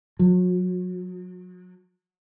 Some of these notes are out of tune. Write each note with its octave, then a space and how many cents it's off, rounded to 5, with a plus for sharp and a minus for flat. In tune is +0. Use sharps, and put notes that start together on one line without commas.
F#3 -35